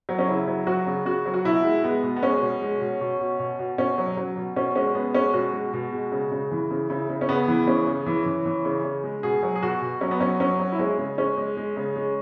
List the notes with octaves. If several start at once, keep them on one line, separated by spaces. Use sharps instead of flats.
F#3
C#4
C#3 E4
F#3
F#3 F#4
C#3
C#3 F#4
F#3
F#4
B2 E4
G#3
G#3 B3
B2
B3
G#3 C#4
B2
G#3
B2
B2
B2
B2
B2
B2 C#4
F#3
F#3
B2
B2 C#4
G#3 C#4
B2 B3
G#3 C#4
B2 F#4
G#3
B2
G#3
C#3
C#3
E3
C#3
C#3 E4
C#3
C#4
C#3 B3
E3
C#3 C#4
C#3
E3
E3
E3
C#3
C#3
G#3
B2 G#4
F#3
G#4
B2 F#4
B2
F#3 C#4
B3
F#3 C#4
F#3 C#4
F#3
E4
G#3 C#4
C#3
G#3 C#4
G#3
G#3
C#3
G#3